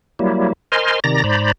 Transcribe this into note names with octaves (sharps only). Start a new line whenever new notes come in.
F#3 G3 A#3 E4
A#4 C5 D#5 G#5 C6 F6
C3 D#3 D5 A#5 A#6
G#2 C5 D5 A#5 B5